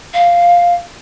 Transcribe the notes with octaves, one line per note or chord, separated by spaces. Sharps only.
F5